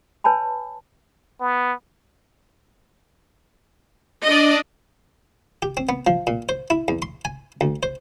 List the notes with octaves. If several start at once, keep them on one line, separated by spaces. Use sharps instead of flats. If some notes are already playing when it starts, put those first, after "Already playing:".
B4 C#5 G#5 A5 B5
B3
D4 D5 D#5
G4
C4
B3
F3
A#2
C5
E4
E2
C6
G#5
D2
C5